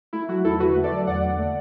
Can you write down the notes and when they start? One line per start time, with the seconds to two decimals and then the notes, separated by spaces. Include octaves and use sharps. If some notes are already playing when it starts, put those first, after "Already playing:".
0.13 A3 E4
0.29 F#3 F#4
0.44 E2 E4 A4
0.60 D3 F#4 B4
0.76 A3
0.84 A4 D5
0.92 F#3
1.07 E2 D5 F#5
1.23 D3
1.39 A3